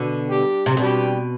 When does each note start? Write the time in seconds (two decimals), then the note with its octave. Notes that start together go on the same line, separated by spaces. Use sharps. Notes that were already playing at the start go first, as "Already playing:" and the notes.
Already playing: B2 D3
0.28 G3 D4 G4
0.66 C3
0.77 B2 G3 D4 G4